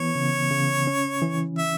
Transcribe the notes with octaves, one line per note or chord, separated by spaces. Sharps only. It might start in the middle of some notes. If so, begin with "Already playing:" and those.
Already playing: E3 B3 C#5
C#3
C#3
C#4
E3
E5